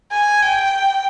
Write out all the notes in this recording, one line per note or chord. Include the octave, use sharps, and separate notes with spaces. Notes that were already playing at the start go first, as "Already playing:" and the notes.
G#5
G5